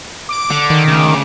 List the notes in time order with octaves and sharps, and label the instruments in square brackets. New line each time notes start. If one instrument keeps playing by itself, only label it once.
[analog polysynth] D6
[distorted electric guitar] D3
[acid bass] D#3
[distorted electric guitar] D2 C#3